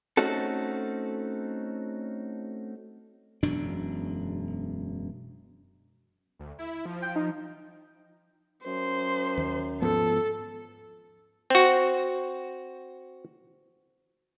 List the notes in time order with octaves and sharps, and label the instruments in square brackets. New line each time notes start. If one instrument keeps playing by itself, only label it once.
[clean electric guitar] A3 C4 C#4 D#4 F#4 A4
[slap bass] E1 F#2 B2 D4
[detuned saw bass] D2
E4
F3
[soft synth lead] G5
D#4
[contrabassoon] F#2 [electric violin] C5
[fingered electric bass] D#2
[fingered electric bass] G#2 F3 B3 [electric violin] A4
[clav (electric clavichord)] C4 F#4